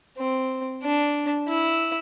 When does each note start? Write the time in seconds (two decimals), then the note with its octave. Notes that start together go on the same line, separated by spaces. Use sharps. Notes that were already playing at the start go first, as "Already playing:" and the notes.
0.18 C4
0.83 D4
1.49 E4